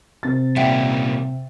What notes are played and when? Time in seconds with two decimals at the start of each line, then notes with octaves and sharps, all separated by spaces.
0.23 C3 A6
0.56 A#2 G3 E5 F#5 G5